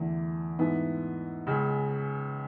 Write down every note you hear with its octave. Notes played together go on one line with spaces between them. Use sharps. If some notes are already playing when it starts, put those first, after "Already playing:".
Already playing: E2 D3 A3
G#2 E3 A3 B3
C#2 C#3 G#3